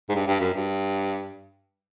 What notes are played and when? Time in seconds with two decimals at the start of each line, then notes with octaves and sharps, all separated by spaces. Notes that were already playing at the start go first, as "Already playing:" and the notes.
0.09 G#2
0.15 G2
0.27 G2
0.40 F#2
0.54 G2